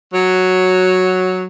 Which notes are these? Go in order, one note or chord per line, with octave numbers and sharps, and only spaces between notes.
F#3